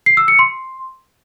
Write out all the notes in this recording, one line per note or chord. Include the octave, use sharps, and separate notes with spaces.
C7
E6
C#7
C6